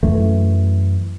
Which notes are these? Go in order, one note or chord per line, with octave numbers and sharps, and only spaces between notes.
F#2 E3 A3